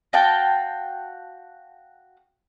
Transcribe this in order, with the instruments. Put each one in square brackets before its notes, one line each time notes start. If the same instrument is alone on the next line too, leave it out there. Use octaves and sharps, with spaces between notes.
[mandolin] F#4 F5 G5 A5